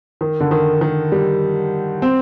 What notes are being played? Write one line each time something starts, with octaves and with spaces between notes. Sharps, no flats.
D#3
D3
D#3
D#3
G3
C4